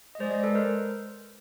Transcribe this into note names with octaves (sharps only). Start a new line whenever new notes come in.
D#5
G#3 C5 D5
C5 D5
A4 B4
A#4 C5